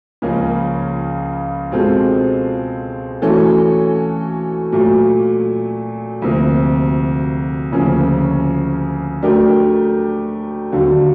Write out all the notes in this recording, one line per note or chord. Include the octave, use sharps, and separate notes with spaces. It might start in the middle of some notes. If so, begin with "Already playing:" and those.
C#2 C#3 F3 A#3 C#4
B2 G#3 C4 F4 A4
E3 A3 C#4 F#4 A4
A#2 F#3 A3
D2 C3 F3 A#3
D2 C#3 F3 A#3 C#4
F#3 A3 D4 G4 A#4
D#2 D3 F#3